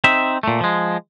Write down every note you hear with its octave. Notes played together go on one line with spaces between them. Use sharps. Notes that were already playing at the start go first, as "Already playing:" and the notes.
C4 D#4 E5
A#2 A3
F3 G#3